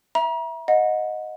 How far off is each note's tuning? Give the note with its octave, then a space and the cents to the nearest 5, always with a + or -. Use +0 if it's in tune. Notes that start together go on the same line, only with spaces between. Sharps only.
E5 +0 A#5 +40
D#5 +0 F#5 -25